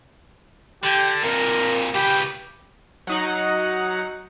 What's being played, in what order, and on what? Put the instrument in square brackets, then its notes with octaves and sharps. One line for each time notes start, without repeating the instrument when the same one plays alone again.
[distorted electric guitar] D3 [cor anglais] G4
[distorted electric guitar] F2 A#2 [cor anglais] A#4
[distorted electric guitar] C#3 B4 [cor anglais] G4
[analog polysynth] F#3 D#4 F#5